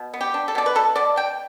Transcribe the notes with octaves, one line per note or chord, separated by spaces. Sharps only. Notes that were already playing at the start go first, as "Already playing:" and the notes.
Already playing: B2
B3
G4
D4
A4
B2 D5
B4
B2 A4
B2 D5
B2 G5